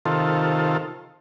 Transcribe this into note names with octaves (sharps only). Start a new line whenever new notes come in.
C3 D#3 F4 A4